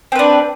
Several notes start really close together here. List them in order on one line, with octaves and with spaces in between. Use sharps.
C4 B4 D4